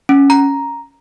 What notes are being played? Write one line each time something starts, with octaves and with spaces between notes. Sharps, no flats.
C#4
A#5